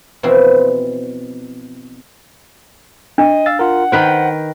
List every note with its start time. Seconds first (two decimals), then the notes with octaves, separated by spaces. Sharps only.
0.23 B2 E3 F3 C4 E4
3.18 D4 D#5
3.46 F5 E6 A6
3.59 F4 A#4 F#5
3.92 D#3 B4 C5 G5